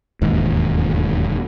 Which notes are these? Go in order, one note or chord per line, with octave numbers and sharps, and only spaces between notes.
E1 D#2 G#2